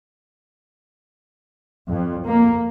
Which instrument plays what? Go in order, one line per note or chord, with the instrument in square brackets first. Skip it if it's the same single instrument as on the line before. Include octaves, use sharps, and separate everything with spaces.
[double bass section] F2
A#3